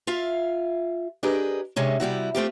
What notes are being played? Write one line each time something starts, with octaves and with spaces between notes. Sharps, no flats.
F4 E5 F5
D4 G4 G#4 A#4 B4 D#5
C3 G#3 C#4 D4
C3 G3 E4 F#4
A3 C4 F4 G4